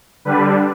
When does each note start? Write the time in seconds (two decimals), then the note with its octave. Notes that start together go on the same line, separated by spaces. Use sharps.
0.25 D3 G3 D4 B4